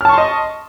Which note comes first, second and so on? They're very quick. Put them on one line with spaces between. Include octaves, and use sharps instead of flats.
F6 A5 C#6 C6 D#5